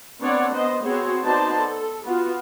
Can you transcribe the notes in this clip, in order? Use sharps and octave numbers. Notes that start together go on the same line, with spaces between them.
B3 C4 D4 C#5 D5 F#5
B3 C5 D#5
B3 C4 F#4 G#4 C5 C#5
B3 D#4 F#4 C5 D5 A5
A4
B3 F4 F#4